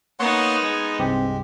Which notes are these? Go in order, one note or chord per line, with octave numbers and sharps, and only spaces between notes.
A#3 B3 D#4 C#5 F#5 C6
G#3 G#6
C2 G2 C4 G4